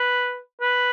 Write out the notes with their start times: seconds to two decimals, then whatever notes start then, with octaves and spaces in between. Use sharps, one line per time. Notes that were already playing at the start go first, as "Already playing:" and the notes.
Already playing: B4
0.61 B4